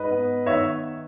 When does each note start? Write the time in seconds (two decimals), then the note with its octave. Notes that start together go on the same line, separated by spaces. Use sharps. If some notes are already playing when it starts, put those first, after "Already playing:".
Already playing: G#2 B4 D#5
0.11 B3
0.46 D#3 C#5 E5